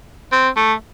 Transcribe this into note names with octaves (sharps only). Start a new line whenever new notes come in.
C4
A3